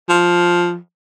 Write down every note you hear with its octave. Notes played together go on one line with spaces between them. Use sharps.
F3